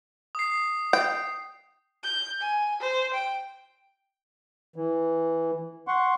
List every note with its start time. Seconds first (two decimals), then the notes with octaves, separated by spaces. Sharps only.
0.35 D#6 C7
0.93 G5
2.04 G6
2.40 G#5
2.81 C5
3.13 G5
4.76 E3
5.88 F#5 C6 C#6